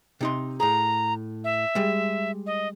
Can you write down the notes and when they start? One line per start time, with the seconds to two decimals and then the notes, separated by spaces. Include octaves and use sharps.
0.21 C3 D#4 C6
0.60 A2 G#4 A#5
1.44 E5
1.75 G3 G#3
2.46 D#5